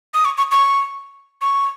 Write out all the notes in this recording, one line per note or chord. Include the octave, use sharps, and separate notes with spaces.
D#6
C#6
C#6
C#6
C#6